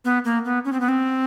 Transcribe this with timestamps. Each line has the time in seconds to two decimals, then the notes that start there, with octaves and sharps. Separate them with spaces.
0.05 B3
0.25 A#3
0.45 B3
0.65 C#4
0.73 C4
0.80 B3
0.89 C4